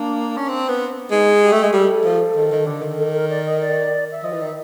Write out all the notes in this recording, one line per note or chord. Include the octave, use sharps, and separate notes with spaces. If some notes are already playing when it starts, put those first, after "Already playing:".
Already playing: A#3 D4
C#4
C4
B3
G#3 D#4
G4
A3
G#3
G3 A4
F3
D#3
D#3
D3
D#3
A4
A#4
D5
D#5
D5
E5
F3 D#5
E3
D#3 E5